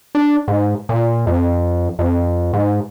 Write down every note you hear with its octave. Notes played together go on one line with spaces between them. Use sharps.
D4
G#2
A#2
F2
F2
G#2